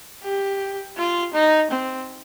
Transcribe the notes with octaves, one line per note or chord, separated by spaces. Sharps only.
G4
F4
D#4
C4